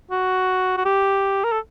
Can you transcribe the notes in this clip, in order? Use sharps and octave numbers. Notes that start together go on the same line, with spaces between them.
F#4
F#4
G4
A#4
A4